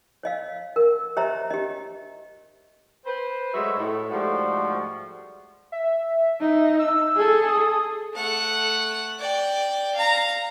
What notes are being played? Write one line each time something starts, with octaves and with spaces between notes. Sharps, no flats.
C#5 D#5 F5
A#4
G4 C5 C#5 D#5 E5 A#5
G4 D#5
B4 C5
F#3 G#3 A3 F#4 E5
A2
G#2 F3 G3 A3 F#4
E5
D#4
E6
G#4 A4
D#6
A3 F#5
D5 G5
F5 A#5